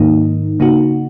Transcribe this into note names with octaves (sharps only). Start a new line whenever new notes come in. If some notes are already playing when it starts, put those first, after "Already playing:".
Already playing: G#2 D#3 A#3 D#4
C#3 A#3 D#4 F#4